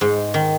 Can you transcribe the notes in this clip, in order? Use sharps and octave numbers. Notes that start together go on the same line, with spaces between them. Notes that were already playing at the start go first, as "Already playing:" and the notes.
G#2
D#3